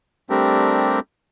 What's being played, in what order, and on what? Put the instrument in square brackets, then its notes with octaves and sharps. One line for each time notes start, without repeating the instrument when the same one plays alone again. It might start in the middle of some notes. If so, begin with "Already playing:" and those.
[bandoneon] G3 A3 C4 D4 G4 A#4